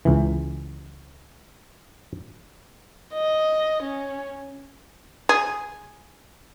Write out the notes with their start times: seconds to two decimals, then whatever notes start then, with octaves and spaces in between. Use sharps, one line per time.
0.05 C#2 E3
3.13 D#5
3.83 C#4
5.29 G#4